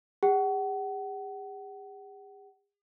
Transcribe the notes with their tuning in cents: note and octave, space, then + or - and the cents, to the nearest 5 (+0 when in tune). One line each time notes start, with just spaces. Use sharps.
G#4 -45 F#5 +35